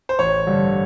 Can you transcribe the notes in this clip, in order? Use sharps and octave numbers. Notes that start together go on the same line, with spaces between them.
C5
A1 C#5
G2 D3 G3